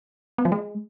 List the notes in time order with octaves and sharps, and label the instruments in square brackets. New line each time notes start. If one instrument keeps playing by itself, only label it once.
[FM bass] B3
F3
G#3